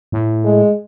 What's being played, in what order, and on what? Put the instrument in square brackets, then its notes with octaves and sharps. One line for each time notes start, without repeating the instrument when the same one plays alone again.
[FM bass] A2
[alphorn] G#3